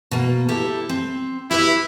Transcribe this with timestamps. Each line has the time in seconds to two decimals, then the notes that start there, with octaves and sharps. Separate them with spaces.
0.11 B2 A#3
0.49 E4 G4 A4
0.89 C4
1.51 E4 G4 B4 E5